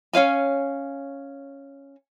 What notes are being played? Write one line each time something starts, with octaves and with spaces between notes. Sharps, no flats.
C#4 C#5 F5 G#5